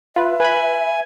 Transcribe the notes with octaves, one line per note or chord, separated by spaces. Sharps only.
F4 B4 E5
B4 G#5 B5